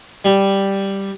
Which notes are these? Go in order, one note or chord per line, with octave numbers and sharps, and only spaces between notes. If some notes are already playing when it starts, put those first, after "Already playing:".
G3